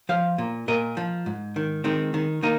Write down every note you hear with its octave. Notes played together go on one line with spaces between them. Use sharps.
F3 C5 F5
A#2
A#2 A#4 D#5
F3
G#2
D#3
D#3 G#3 C4
D#3
D#3 A#3 D#4